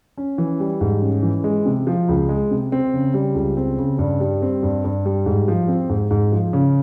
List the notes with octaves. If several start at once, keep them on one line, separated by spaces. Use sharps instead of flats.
C#4
E3
G3
G#2
C#4
E3
G#3
C3
F3
C#2
G#3
C3
C4
C#3
G3
C#2
C4
C#3
G2
G3
C4
G2
G2
G3
G#2
F3
C4
G#2
G#2
F3
C#3